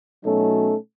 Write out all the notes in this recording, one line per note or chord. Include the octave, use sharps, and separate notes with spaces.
B2 F#3 A3 C#4 D#4 A4